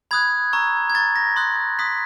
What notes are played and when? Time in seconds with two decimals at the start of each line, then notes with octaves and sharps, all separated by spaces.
0.11 B5 D#6 F#6 G#6
0.53 A#5 C#6 E6
0.90 G#6
0.94 A#5 C#6 E6 A6
1.16 A#6
1.36 C6 D#6 F#6
1.79 C6 D#6 F#6 B6